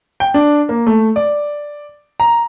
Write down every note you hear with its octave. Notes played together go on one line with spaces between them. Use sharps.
G5
D4
A#3
A3
D5
A#5